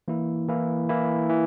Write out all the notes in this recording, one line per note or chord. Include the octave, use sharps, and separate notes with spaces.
E3 A#3 E4
E3 A#3 E4
E3 A#3 E4
E3